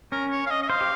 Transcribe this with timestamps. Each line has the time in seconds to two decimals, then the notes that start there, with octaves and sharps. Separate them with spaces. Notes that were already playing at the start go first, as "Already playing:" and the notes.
0.12 C#4 A#4
0.31 C#5
0.46 F5
0.51 D#5
0.63 D#5
0.69 C5 F5
0.81 G4